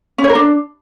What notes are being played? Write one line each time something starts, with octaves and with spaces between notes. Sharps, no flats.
C#4
C#5
A#4
D4